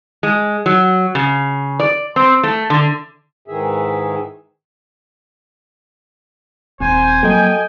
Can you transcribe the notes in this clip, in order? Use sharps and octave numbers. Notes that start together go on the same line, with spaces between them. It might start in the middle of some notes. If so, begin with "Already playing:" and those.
G#3
F#3
C#3
D5
C4
A3
D3
G#2 D#3 E3 G#4 E5
D#1 C4 C5 G#5
F3 F#3 A#3 A4 D#5 G5